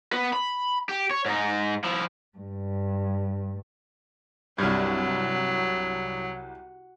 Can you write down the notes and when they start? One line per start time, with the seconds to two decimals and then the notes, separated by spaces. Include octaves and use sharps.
0.12 B3 B4
0.33 B5
0.89 G4
1.11 C#5
1.26 G#2 D#4
1.84 F3 E4
2.38 G2
4.58 C2 G2 F#3 G3 F6 G#6